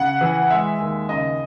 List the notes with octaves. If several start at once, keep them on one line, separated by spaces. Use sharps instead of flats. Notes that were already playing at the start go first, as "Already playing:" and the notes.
Already playing: C#3 F#5
E3
G#3 E5
D#2
C#3 D#5